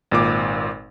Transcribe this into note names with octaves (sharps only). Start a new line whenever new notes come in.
G#1 A#2 D6